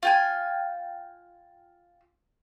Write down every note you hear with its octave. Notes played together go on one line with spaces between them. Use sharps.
F4 G5 G#5